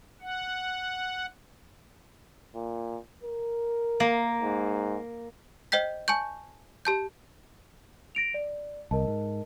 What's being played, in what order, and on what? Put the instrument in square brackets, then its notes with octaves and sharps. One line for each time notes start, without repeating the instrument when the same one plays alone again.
[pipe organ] F#5
[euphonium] A#2
A#4
[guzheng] A#3
[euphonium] G#2
[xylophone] C5 D#5 G5 G6 B6
G#5 A5 C#6 G6
G4 A5 G6
[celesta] A#6 D7 F7
D5
[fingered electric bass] C2 [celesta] A#4 D#5 A5
[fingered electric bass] G#2